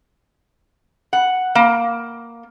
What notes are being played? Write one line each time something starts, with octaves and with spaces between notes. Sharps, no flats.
F#5
A#3